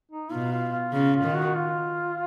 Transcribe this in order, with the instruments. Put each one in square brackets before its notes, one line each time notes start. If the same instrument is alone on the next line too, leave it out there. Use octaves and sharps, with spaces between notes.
[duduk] D#4
[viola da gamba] B2 [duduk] F4
[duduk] F4
F4
[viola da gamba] C#3 [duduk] F4
[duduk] F4
[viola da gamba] D#3
[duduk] F#4
F4